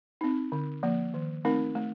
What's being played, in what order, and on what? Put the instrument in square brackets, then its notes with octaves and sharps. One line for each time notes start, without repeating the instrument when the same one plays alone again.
[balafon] C4 D#4
D3
F3 A#3
D#3
A3 C4 D#4 A#4
A3